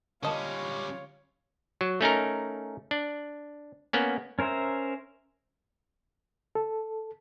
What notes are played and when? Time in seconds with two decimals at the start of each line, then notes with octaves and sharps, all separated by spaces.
0.23 D3 G3 A#3 C#4 F4 C#5 D#5 A5
1.81 F#3
2.01 A3 C#4 D#4 A#4
2.91 D4
3.93 A#3 B3 C#4
4.39 C#4 A#4 C5 E5 A#5
6.55 A4